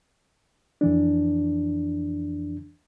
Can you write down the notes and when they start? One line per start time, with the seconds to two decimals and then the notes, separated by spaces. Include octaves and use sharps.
0.81 F2 E3 D4